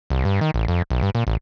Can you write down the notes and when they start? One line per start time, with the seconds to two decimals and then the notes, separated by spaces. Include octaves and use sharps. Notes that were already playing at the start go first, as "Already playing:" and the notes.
0.10 C2
0.25 G2
0.41 D#3
0.54 A1
0.68 F2
0.90 B1
1.02 G2
1.15 A#2
1.27 A1